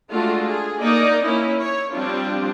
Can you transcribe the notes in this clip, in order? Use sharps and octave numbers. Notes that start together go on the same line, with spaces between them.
G#3 A3 D4 F4 F#4
G#4
A#3 D#4 D5 D#5
A#3 C#4 E4
C#5
F3 G3 C4 D4 F4